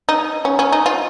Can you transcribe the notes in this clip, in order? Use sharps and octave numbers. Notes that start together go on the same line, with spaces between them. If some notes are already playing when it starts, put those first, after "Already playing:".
D#4
C#4
C#4
D#4
F4